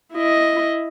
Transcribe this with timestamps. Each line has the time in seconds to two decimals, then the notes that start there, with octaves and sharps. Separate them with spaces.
0.13 E4 D#5